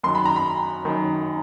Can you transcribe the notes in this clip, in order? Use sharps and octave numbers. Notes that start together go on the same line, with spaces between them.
F#2 D#3 F#3 C6
B5
A#5
B5
F#2 D#3 F#3